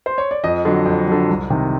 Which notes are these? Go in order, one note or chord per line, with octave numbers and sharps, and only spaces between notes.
C5
C#5
D5
F2 D#5
D3 F#3
F2
D3 F#3
C2
C3 D#3